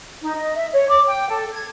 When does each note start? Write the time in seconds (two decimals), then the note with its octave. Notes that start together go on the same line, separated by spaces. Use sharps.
0.21 D#4
0.35 D#5
0.56 E5
0.72 C#5
0.88 D6
1.07 G5
1.29 A4
1.52 G#6